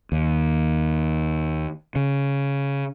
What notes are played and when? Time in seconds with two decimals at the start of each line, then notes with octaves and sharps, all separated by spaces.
0.12 D#2
1.95 C#3